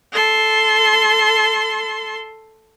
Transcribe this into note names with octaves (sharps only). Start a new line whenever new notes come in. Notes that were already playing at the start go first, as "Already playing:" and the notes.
A4 C6